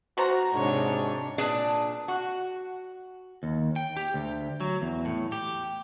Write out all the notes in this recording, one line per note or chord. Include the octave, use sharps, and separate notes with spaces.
B2 F#4 C5 A#5
G#2 C3 D4 C#5
A#2 D4 G#4 B4 D5 A5
F#4
D#2
G5
G4
D2
F#3
E2
A2
G4